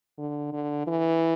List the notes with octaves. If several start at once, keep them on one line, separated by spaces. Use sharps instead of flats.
D3
D3
E3